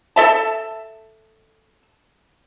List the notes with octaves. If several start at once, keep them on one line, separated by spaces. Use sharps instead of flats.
A4 E5 A5